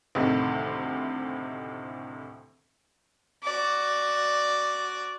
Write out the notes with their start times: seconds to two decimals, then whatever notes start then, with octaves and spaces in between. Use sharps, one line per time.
0.15 D2 A2 C3 D#3
3.43 F#4 D5